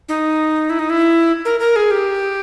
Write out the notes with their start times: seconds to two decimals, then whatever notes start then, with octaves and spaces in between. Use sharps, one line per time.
0.09 D#4
0.70 E4
0.79 D#4
0.90 E4
1.45 A#4
1.60 A#4
1.76 G#4
1.91 G4